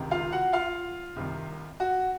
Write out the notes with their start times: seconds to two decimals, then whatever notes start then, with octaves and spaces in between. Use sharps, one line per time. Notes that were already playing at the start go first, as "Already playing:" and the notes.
Already playing: C#2 C3 D#3
0.11 F4 F5
0.32 F#4 F#5
0.53 F4 F5
1.16 C2 C3 D#3
1.80 F#4